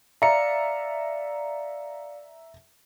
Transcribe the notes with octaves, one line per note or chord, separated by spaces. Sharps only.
D5 E5 F5 A#5 C#7